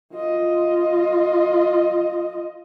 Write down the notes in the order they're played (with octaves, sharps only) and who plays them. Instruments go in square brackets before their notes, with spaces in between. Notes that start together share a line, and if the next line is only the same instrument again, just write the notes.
[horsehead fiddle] F4 D#5